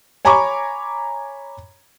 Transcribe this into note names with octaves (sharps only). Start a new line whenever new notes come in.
C#5 G#5 A#5 B5 C#6 D6